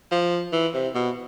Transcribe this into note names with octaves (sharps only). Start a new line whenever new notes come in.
F3
E3
C3
B2